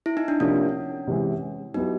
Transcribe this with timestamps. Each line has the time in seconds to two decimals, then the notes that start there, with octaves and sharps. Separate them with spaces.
0.06 E4
0.17 D#4
0.28 D4
0.40 C3 F3 A#3 C#4 D4
1.07 C3 E3 G#3
1.74 F#3 B3 D#4 E4 G4